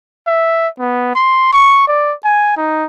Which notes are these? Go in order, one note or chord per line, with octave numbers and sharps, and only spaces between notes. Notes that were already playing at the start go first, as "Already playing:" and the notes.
E5
B3
C6
C#6
D5
G#5
D#4